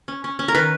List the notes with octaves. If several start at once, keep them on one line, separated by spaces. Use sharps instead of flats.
C#4
C#4
C#4
A#4
D#3 B4